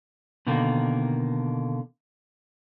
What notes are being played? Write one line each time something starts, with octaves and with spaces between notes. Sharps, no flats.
B2 D3 D#3 A#3